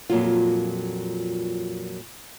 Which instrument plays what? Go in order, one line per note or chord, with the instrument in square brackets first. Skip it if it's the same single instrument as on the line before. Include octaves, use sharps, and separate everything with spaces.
[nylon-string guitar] F2 A#2 F#3 F4